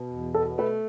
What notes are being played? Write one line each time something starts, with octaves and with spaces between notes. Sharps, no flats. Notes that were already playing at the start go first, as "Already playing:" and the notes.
Already playing: B2
E2
B2 A4
A3 B4